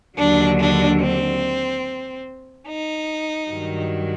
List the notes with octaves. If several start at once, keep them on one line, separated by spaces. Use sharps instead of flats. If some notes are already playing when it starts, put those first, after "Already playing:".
D#2 D3 F#3 D4
D4
C4
D#4
G2 D#3 F#3